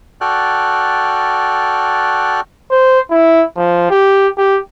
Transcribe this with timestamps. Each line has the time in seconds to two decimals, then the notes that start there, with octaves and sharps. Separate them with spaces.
0.21 F#4 A4 D5 G5 F6 F#6
2.71 C5
3.11 E4
3.56 F3
3.90 G4
4.38 G4